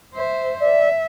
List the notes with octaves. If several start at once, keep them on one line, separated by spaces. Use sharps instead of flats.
C5 E5
D5 E5